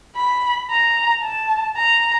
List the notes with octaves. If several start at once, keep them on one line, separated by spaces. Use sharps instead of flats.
B5
A#5
A5
A#5